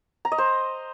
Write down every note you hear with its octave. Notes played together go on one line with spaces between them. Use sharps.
A#5
D#5
C5